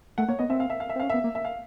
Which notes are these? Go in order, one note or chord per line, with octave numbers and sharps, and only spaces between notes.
A3 F#5
A#3 C#5
B3 D#5
C4 E5
F5
E5
F5
E5
C4
C#4 F5
B3 E5
A#3
E5
F5